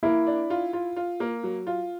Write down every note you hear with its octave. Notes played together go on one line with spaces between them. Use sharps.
A#3 E4
D4
F4
F4
F4
A#3
F#3
F4